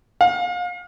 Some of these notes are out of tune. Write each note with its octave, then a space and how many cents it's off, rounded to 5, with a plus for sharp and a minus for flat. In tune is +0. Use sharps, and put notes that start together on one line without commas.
F5 +35